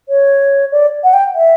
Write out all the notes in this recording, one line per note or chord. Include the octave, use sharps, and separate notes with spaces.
C#5
D5
F#5
G5
E5